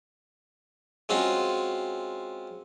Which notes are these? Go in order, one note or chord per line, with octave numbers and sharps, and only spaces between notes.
G#3 C4 C#4 F4 F#4